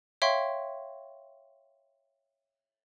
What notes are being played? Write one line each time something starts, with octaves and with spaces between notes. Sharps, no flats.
C#5 E5 F5 G5 C6 C#6